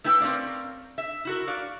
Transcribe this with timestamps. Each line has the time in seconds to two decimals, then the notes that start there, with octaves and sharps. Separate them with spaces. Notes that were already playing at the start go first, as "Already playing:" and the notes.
0.04 A3 E4 B4 G5
0.21 C4 C#4 A#4 D5 F5
0.98 E5
1.25 E4 F#4 A#4
1.47 F#4 D5 F5